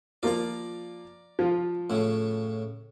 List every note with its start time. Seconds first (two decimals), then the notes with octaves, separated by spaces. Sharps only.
0.23 F3 A#3 F4 D5 A#5
1.39 F3 F4
1.90 A2 C#3